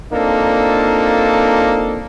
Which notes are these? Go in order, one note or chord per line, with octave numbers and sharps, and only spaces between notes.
A#3 C4 D4 D#4 F4 A4